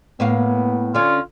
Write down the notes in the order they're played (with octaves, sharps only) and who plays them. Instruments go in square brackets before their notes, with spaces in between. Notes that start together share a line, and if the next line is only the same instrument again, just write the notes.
[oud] A2 A#3 F5 [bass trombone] B3
[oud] D3 C#4 [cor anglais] F4